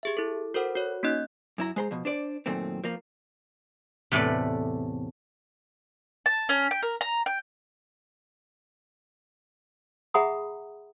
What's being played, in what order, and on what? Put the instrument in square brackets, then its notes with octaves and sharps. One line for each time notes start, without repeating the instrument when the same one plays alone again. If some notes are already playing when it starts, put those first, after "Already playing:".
[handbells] G4 G#4 E5
E4 A4
F#4 A4 A#4 C5 F#5
F#4 C#5
A#3 C#4 D#4 D#5 F#6 G6
[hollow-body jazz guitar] F#2 E4 A#5
G#3 C5 A#5
B2 F3
D4 C5 D5
F#2 A#2 D#3 A3 C4
F3 A#3
[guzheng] E2 A2 C3 A3 B4 D5
[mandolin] A5
C#4
G5
A#4
A#5
G5
[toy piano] G#4 E5 F#5 A#5 B5 D#6